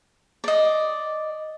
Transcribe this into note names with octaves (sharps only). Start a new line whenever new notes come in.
D5 D#5